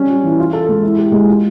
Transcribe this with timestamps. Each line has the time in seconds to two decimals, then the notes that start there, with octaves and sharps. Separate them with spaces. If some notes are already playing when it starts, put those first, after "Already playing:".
Already playing: G3 C#4
0.09 F4
0.24 E3
0.39 F4
0.53 A4
0.69 G#3
0.83 E4
0.98 G4
1.12 G#3
1.27 F4